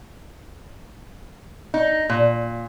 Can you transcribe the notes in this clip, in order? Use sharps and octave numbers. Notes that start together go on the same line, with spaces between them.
D#4
A#2